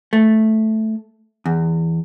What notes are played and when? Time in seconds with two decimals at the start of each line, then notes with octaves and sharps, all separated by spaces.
0.13 A3
1.46 E2